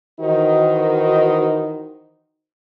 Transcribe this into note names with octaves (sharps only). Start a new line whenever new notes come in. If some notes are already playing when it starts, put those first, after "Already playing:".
D#3 E3 D#4 F#4 C5